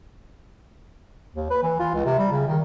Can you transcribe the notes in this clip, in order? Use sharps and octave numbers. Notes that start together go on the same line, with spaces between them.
D#2
B4
E3
F4
C#2
C3
G3
C#3
D#3